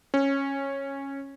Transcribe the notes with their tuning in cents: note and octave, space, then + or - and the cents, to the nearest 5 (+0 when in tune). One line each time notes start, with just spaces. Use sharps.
C#4 -10